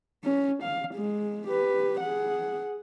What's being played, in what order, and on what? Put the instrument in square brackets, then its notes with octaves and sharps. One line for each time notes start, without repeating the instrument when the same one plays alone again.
[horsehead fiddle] C#4
F5
G#3
G4 B4
G#4 F#5